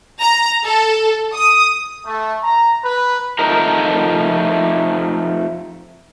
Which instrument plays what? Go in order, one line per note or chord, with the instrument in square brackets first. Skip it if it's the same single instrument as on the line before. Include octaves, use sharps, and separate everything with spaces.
[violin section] A#5
A4
D#6
[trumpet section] A3
A#5
B4
[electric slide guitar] F2 F3 A3 D#4 A#4 A#5